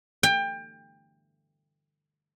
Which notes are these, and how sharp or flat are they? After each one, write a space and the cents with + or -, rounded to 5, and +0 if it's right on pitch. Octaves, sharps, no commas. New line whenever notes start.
G5 +25